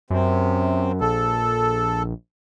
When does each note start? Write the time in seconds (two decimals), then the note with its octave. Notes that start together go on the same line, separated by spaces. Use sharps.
0.10 F#2 C3
1.01 A#1 A4